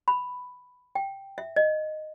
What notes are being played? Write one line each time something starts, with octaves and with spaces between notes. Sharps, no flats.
B5
G5
E5
D#5